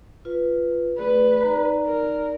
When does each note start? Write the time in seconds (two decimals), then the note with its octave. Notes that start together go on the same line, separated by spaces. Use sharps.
0.25 F4 B4
0.98 A3 G#4 B4 D5
1.41 D#4 D5 A#5
1.86 A#4